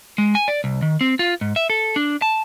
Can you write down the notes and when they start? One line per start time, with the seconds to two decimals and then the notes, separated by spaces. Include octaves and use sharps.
0.18 G#3
0.35 G#5
0.48 D5
0.64 C2
0.82 D#3
1.01 C4
1.19 F4
1.41 G#2
1.56 E5
1.70 A4
1.96 D4
2.22 A5